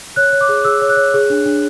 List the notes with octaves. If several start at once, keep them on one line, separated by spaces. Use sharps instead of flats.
C#5 F#6
C#5
D6
G#4
G#4 E6
C#5
F#6
C#5
G#4
D4
D4